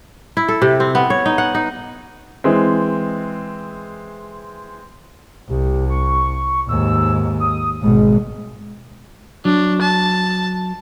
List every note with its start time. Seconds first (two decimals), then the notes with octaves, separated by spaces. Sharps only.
0.37 E4
0.48 A4
0.62 C3
0.80 C4
0.95 B3
1.10 C#5
1.26 D#4
1.38 F#5
1.55 D#4
2.44 E3 G#3 C4
5.50 C2 G4
5.90 C#6
6.69 D#2 G#2 E6
7.40 D#6
7.82 G#1 B2 G#3
9.45 F#3 D4
9.81 A5